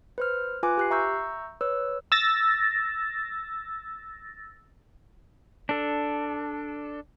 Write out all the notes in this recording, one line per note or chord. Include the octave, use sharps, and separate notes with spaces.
B4 C5 F6
F4 B4 G#5 D6 F#6
G4 F#6 C7
E5 A#5 C#6 E6 G6
B4 C#5 E6
E6 A6 A#6
D4 A4